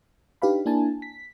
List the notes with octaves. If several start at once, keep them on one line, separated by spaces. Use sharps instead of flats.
D4 D#4 G4 B4 F5 B5
A#3 D4 E4 G#5 A5
B6